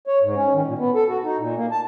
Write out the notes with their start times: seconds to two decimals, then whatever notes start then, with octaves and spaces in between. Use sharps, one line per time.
0.07 C#5
0.22 G#2
0.36 C#4
0.53 D#3
0.65 A#2
0.78 B3
0.95 A4
1.08 F#4
1.24 D#4
1.38 A#2
1.56 A#3
1.71 A5